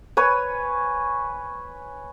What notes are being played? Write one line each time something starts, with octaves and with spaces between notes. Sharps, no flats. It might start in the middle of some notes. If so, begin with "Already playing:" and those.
B4 C#5 G#5